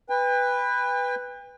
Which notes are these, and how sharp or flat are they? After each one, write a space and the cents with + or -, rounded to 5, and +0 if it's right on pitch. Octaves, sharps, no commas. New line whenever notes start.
B4 +0 G5 +40